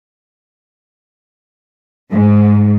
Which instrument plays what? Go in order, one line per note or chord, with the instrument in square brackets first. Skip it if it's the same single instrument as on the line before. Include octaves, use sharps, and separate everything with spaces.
[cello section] G#2